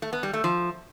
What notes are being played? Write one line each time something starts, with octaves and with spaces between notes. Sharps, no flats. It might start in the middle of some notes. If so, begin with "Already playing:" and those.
A3
B3
G3
A3
F3